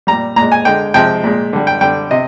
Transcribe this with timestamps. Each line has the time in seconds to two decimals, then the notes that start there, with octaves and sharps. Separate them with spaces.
0.07 A#2 G3 A#5
0.36 A#2 G#3 A#5
0.52 G#5
0.65 D3 G#3 G5
0.94 C3 F3 G#3 G5
1.24 A#2 G#3
1.53 D3 G3
1.67 G5
1.81 D3 G3 G5
2.11 C3 D#5